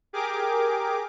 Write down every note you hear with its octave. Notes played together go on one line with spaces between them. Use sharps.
G4 G#4 A#4 D6